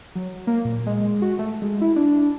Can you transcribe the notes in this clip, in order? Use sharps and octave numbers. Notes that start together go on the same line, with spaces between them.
F#3
A#3
A#2
G#3
G#3
F#4
A3
G#3
E4
D4